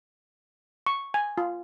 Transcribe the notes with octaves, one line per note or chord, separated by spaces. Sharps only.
C#6
G#5
F4